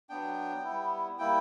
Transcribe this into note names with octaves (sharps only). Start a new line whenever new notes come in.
F#3 B3 D4 G5
G3 B3 E4
G3 A#3 E4 G5